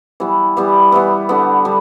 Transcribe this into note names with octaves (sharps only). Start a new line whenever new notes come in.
E3 G3 B3
E3 G3 B3
E3 G3 B3
D3 G3 B3
D3 G3